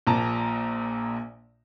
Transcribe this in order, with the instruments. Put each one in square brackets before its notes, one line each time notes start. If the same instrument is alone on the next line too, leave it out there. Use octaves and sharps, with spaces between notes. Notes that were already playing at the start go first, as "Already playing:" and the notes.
[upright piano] A#1 A#2 A5 A#5